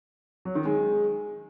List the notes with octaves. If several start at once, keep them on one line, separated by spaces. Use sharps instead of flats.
F#3
D#3
G#3